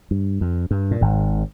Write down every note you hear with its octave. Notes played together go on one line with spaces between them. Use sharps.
G2
F2
G2
A#2
G#1 G#2